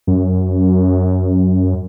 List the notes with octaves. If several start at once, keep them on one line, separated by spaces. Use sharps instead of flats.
F#2